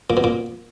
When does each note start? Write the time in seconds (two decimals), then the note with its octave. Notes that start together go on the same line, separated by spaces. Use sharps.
0.10 A#2
0.17 B2
0.24 A#2